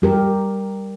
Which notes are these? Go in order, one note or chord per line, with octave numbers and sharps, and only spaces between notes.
G3 G4 A#4